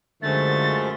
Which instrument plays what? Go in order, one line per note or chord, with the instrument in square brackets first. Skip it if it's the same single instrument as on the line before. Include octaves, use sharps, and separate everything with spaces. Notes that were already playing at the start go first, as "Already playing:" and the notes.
[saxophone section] F#2 A3 [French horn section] D3 [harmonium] F3 G#3 [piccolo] A6